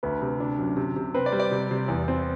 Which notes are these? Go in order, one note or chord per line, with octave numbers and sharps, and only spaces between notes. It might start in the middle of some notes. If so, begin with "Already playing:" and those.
D2 B4
C3
D4
F#2
C3
C3
C4 B4
D5
G3
D5
C3
C3
E2
C4